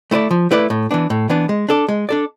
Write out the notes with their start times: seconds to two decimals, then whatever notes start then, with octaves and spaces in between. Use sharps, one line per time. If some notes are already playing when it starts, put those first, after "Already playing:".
0.11 A3 E4 B4 D5
0.31 F3
0.51 A3 E4 B4 D5
0.70 A2
0.91 E3 B3 D4
1.10 A2
1.30 E3 B3 D4
1.49 G#3
1.69 D4 A4 D5
1.88 G#3
2.09 D4 A4 D5